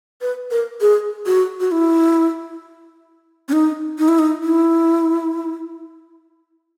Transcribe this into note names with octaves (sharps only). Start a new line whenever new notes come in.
B4
A#4
G#4
F#4
F#4
E4
C#4
D#4
D#4
E4
D#4
E4